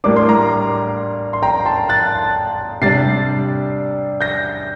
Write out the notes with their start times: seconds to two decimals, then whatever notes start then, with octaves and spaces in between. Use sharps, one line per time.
0.04 A2 G3 A#3 D4 D6
0.16 C6
0.29 A#5 D6
1.33 C6
1.43 G5 A#5
1.66 A5 C6
1.89 F#6 A6
2.82 C3 G3 D4 A6 C7
4.21 G6 A#6